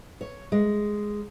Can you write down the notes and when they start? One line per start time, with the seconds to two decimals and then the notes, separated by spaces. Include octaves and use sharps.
0.21 C#5
0.52 G#3